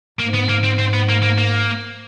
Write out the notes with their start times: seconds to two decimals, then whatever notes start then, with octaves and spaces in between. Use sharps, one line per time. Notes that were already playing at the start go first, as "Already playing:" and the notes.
0.19 G#2 A#3
0.35 B3
0.49 A#3
0.64 C4
0.79 C4
0.94 B3
1.09 A#3
1.23 A#3
1.38 A#3